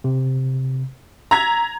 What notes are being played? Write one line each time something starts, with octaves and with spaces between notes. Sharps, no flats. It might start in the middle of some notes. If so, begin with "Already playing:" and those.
C3
A#5 E6 G#6 B6